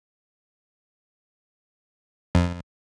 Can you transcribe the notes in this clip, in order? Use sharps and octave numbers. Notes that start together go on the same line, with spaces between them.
F2